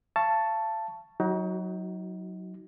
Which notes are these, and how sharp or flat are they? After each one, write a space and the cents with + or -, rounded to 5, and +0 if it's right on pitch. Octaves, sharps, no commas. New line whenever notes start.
F5 -45 A5 +5 C#6 +0
F#3 +0 D#4 +35 F#4 +25